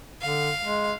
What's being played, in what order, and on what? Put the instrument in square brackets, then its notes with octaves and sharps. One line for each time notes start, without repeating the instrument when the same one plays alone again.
[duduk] D3 [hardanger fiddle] F5
[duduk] G#3